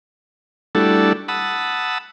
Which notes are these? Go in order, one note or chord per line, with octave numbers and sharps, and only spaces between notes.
G3 A3 D4 E4 F#4 A4
F#5 A5 B5 D#6 E6